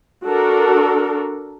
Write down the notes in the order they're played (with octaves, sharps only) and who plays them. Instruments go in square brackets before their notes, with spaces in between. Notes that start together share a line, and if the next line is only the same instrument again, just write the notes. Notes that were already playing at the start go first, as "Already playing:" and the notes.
[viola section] D4 F#4 A4 A#4